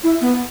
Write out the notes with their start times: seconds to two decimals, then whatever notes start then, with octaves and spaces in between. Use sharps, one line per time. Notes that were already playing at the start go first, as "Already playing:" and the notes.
0.04 E4
0.21 B3